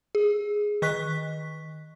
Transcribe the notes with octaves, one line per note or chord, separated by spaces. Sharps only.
G#4
D#3 D#5 C#6 F#6 B6